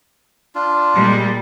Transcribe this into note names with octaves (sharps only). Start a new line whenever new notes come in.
D4 F4
A#2 G3 G#3